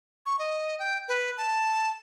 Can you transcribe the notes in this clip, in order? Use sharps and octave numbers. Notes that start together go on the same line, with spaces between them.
C#6
D#5
G5
B4
A5